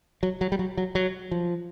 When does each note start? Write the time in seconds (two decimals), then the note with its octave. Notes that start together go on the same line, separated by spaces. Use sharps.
0.23 F#3
0.41 F#3
0.52 G3
0.59 F#3
0.77 F#3
0.95 F#3
1.31 F3